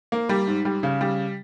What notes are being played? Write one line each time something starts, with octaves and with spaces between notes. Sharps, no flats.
A#3
G3
G#2
G3
C#3
G3